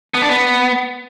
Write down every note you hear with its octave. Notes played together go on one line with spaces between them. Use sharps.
B3
D4
B3